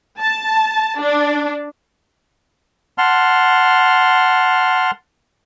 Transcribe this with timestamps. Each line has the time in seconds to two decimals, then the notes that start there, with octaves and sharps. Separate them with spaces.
0.20 A5
1.01 D4
2.98 F#5 A5 C6 F6